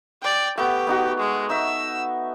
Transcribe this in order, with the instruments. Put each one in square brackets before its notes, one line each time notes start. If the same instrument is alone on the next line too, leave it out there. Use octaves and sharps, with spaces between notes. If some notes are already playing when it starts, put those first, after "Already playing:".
[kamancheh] D5 G5
[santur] A3 B3 [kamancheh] G4
[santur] B3 D#4 F#4
[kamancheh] G#3
[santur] D#4 E5 [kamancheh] E6